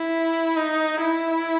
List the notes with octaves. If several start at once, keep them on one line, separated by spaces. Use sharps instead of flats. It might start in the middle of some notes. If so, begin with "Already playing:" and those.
Already playing: E4
D#4
E4